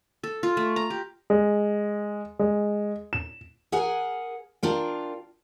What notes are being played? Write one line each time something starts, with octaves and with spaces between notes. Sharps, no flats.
A4
F4
A3
A#5
G4
G#3
G#3
E7
G#4 A#4 F#5 G#5
D4 F4 A#4 G5